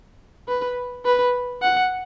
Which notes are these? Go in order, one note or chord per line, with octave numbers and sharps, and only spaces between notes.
B4
B4
F#5